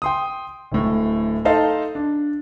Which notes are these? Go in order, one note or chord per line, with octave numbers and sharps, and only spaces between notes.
G5 C6 D#6
D1 A2
D#4 A4 C5 D#5 F5 A5
D4